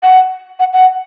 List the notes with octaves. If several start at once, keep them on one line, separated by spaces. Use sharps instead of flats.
F#5
F#5
F#5